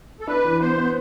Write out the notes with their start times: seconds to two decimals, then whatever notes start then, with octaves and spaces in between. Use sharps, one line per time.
0.20 A4
0.27 D4 B4
0.44 E3
0.60 B3 C5
0.78 B3